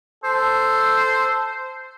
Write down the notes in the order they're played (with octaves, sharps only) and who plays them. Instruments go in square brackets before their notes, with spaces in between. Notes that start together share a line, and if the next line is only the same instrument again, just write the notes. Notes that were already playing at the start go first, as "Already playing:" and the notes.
[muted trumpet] A4 [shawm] C5